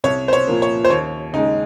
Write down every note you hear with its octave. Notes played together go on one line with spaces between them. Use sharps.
C2 C#5
C5
C#5
A#2 F3 A#3
C#5
C5
D#2 C#5
C#3 G#3 D#4